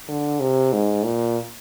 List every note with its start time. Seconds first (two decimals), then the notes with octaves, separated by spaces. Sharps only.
0.08 D3
0.40 C3
0.73 G#2
1.05 A#2